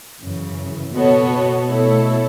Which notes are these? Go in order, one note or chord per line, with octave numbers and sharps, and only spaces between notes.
F#2 C#3 E3
B2 B3 F#4 A4 C#5
B2 A3 E4 A4 C#5